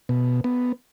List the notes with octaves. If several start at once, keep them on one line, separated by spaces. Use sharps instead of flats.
B2
B3